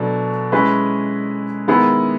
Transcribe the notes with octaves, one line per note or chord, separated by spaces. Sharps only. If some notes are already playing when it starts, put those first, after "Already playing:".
Already playing: B2 F#3 A3 D4
G#3 C#4 E4 G#4 B4
D#3 G#3 B3 E4 G#4